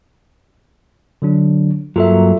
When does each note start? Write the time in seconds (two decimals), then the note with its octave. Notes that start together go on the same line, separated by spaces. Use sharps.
1.22 D3 F#3 D4
1.96 G2 F#3 A#3 F4 A4 E5